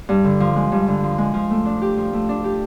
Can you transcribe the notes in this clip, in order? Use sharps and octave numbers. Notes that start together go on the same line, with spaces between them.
G2
D3
F3
G#3
G2
D3
F3
G#3
F3
A3
D4
G4
F3
A3
D4
G4